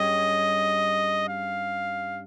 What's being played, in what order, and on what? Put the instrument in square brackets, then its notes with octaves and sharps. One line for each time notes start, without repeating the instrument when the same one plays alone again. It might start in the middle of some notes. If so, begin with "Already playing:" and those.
Already playing: [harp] G2 G3 C#4 G#4 C#5 [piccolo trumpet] D#5
[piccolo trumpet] F5